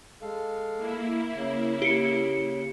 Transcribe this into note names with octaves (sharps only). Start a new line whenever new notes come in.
G#3 A4 F5
A#3 E4
C#3
G4 C#7